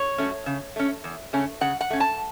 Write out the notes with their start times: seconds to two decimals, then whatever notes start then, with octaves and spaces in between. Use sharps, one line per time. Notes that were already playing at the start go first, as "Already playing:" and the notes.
Already playing: C#5
0.18 F#3 A3 C#4
0.46 C#3
0.76 A3 C#4
1.04 E2
1.33 C#3 A3 C#4
1.61 C#3 F#5
1.81 F#5
1.90 A3 C#4
2.00 A5